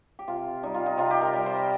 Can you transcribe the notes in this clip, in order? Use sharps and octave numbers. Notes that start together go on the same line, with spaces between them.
G4
C3 F4
G3 D#4
F4
D#4
C3 F4
G4
A#4
G3
C5